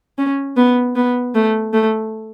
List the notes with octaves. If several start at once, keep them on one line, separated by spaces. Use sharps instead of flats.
C#4
B3
B3
A3
A3